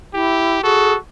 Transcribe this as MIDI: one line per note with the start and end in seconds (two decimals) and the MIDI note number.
0.14 0.59 64
0.14 0.61 67
0.64 0.95 66
0.64 0.93 68
0.64 0.97 69